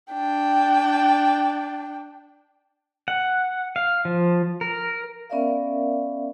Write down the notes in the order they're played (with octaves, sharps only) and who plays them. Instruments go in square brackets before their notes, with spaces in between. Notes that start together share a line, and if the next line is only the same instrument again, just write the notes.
[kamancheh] D4 G5
[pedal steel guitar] F#5
F5
F3
A#4
[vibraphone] B3 C#4 A#4 D5 E5 F5